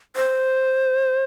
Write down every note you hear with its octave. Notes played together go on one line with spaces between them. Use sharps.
C5